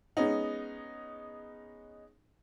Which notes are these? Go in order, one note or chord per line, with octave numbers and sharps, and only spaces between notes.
G#3 B3 C#4 D#4